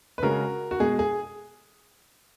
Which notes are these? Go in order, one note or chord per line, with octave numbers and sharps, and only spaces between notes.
B4
C#3 G#3 F#4 A#4
F#4
B2 G#3 G#4
G#4